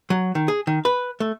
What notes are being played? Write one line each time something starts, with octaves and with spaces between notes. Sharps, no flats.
F#3
D#3
G#4
D#3
B4
A3